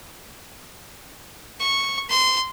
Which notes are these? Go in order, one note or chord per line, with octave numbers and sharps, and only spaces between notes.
C#6
C6